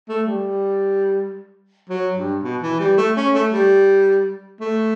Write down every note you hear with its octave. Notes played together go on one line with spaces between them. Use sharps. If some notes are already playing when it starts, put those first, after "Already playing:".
A3
G3
F#3
G2
B2
E3
G3
A3
C#4
A3
G3
A3